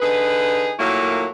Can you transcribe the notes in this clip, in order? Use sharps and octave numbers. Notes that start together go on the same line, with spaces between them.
D3 D#4 G#4 B4
A#2 F#3 A3 A#3 E4